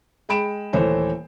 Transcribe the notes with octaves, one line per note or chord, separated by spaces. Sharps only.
G#3 G5 B5 D7 E7
D#1 E3 A3 C5 C#5